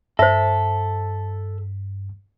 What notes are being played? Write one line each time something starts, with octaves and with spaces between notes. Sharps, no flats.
G2 A4 C5 E5 B6